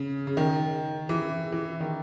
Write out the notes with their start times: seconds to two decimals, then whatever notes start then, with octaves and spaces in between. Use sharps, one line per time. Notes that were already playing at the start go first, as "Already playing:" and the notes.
Already playing: C#3
0.27 C#3
0.37 D#3
1.09 E3
1.52 E3
1.80 D#3